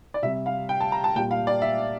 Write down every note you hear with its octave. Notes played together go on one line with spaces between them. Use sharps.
D5
C3 G3 E5
F5
G5
A5
A#5
A5
A#2 G3 G5
F5
D5
E5